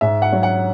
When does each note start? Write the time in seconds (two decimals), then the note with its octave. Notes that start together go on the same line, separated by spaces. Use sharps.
0.01 G#2 E5
0.22 F#5
0.32 F#3
0.43 F#5